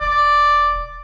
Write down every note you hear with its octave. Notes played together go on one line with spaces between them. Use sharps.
E1 D5